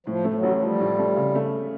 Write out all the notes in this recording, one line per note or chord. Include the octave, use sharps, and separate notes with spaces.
A2 F3
A3
F#3
A1
F3 G3
A2
A3
C#3
A3